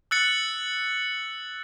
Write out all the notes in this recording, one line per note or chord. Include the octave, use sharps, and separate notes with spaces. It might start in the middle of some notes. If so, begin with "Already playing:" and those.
E6 F#6 A6 C#7 F#7